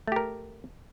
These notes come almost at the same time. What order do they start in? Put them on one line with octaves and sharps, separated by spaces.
A3 G4 A#4